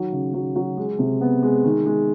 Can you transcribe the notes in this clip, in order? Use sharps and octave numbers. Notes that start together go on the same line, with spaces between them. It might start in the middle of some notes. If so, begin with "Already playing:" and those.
Already playing: D#3 F#3
C#3
F#3
F#3
G#3
C3
B3
G#3
D#3
G#3